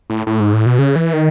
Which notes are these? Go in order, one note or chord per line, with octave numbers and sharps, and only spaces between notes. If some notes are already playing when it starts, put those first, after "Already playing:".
A2
A2
G#2
A2
B2
C#3
E3
D#3